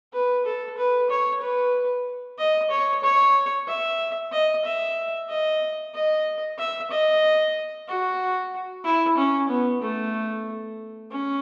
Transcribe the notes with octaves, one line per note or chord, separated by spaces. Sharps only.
B4
A4
B4
C#5
B4
D#5
C#5
C#5
E5
D#5
E5
D#5
D#5
E5
D#5
F#4
E4
C#4
B3
A3
C#4